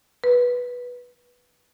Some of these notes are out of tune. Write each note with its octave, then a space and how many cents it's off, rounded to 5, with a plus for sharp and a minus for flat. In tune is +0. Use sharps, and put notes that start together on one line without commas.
B4 -10